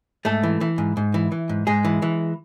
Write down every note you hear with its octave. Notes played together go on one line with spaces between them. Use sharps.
G#2 A3 A4
E3
E3
G#2
G#2
E3
E3
G#2
G#2 G#3 G#4
E3
E3